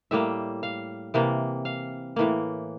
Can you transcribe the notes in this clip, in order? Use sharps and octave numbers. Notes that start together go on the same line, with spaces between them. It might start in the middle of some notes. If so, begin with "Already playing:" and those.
A2 G3 A#3 E5
F5
C3 E3 A#3
F5
A2 E3 A#3